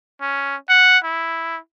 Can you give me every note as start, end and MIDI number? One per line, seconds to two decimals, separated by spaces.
0.21 0.56 61
0.69 0.98 78
1.04 1.58 64